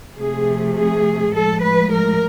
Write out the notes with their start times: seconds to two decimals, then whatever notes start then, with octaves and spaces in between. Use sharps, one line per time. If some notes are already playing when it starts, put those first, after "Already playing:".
0.17 C3 F3 A3 G#4
0.76 G#4
1.33 A2 F3 G#3 A4
1.62 B4
1.92 A#4